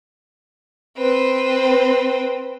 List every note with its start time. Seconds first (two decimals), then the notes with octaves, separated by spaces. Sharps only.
0.97 C4 B4